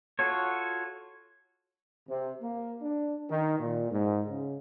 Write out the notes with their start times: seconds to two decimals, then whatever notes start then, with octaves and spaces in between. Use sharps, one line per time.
0.19 F4 F#4 A4 C#5
2.09 C3
2.41 A#3
2.81 D4
3.30 D#3
3.59 A#2
3.91 G#2
4.29 C#3